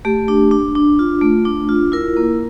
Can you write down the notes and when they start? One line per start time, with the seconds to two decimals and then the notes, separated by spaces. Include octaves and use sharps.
0.05 A3 G4
0.28 D4
0.51 D4
0.75 D4
0.99 F4
1.21 A3
1.45 D4
1.69 F4
1.92 E4 A#4
2.17 A#3